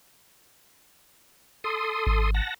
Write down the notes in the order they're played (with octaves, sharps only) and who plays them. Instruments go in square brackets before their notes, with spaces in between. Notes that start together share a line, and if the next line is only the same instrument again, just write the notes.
[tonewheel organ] A4 C6 D#6
[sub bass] G#1
[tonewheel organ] F#5 A5 A#6